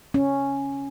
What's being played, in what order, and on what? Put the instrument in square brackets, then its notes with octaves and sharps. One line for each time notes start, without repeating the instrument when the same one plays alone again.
[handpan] C#4